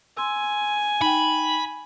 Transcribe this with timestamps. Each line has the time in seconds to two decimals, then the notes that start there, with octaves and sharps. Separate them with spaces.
0.17 G#5 C6 E6
1.01 D#4 G5 B5